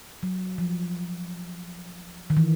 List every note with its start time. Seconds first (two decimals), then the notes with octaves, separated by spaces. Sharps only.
0.23 F#3
0.58 F3
2.30 D#3
2.37 E3